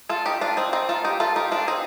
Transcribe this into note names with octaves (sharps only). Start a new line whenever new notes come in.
F4 A4
D#4 G4
D4 F4
C4 D#4
C4 D#4
F4 A4
D#4 G4
F4 A4
D#4 G4
D4 F4
C4 D#4